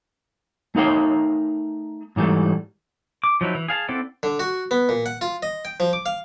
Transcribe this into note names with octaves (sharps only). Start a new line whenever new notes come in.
A3 D#4 A#4 F5 G5
G#2 E3 G3 A3
D6
F3 F#3 D#4 E4
E3
G#4 F5 A5
C4 E4 A4 D5 F#5
D3
F#4
B3
A#2
F#5
F4
D#5
G5
F3
D6
F5